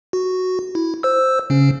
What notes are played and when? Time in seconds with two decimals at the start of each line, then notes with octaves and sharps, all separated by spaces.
0.13 F#4
0.75 E4
1.03 C5 E6
1.50 C#3 C#4